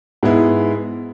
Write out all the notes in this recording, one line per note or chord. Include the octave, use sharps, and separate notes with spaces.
G#2 G#3 B3 E4